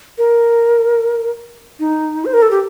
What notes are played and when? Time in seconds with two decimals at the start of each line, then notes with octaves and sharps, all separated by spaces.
0.18 A#4
1.80 D#4
2.25 C5
2.34 A#4
2.42 A4
2.51 G4